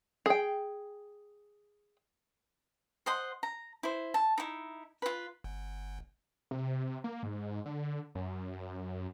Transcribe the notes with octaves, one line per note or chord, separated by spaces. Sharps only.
G#4 G5
C5 D#5 F#5 C6
A#5
E4 C5
A5
D#4 E4
F4 B4
G1
C3
A#3
G#2
D3
F#2